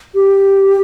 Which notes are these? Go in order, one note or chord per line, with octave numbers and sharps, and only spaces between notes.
G4